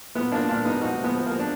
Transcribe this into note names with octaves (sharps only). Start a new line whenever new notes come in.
A#2 B3
F3 A#3 D4
A#2 A#3 D4
A#2 B3 D#4
F3 D#4 F#4
F3
B3
F3
F3 A#3
D4